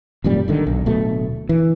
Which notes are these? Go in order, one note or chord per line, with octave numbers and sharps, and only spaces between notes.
G#1 F#2 A#2 G3
G#1 D3 D#3
B1
D1 B2 A3
E3